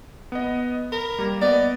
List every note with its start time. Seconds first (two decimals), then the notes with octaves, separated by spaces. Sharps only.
0.32 B3 D#5
0.92 A#4 B5
1.19 G3 A#3
1.42 B3 D5 D#5